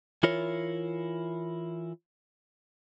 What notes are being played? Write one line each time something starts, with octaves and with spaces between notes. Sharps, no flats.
E3 E4 F4 A#4 C#5